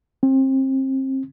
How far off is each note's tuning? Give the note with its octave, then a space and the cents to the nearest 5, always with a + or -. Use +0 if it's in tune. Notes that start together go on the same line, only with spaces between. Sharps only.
C4 +30